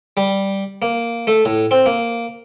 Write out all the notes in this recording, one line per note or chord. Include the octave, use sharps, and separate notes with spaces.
G3
A#3
A3
A2
C4
A#3